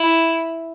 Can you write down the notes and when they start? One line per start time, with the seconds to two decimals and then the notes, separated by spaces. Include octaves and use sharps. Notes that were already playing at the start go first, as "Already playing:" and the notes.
Already playing: E4